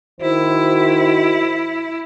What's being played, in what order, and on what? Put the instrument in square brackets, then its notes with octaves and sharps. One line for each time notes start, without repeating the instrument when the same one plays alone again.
[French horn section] D#3 F#4 C5 [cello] E4